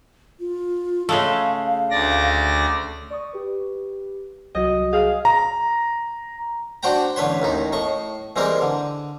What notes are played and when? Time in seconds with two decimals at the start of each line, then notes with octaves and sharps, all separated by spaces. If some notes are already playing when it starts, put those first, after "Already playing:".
0.40 F4
1.09 C#3 G#3 A3 F5
1.90 D2 D5 A#6
3.10 D5 C#6 D#6
3.33 G4 B4
4.55 C2 F#3 F#4 D#5
4.93 G#4 F5
5.25 A#5
6.83 D4 F#4 C5 F#5 G5 A#5
7.16 A1 D3 B4 C#5 C6
7.42 A1 D#2 D#4
7.72 A2 D#5 C#6
8.36 E3 G3 G#3 C4 A#4
8.61 D3